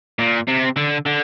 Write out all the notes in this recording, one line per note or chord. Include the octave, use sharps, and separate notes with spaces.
A#2
C3
D3
D3